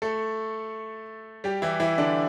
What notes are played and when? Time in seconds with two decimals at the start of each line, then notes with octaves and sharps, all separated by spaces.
0.02 A3 A4
1.44 G3 G4
1.62 E3 E4
1.80 E3 E4
1.98 D3 D4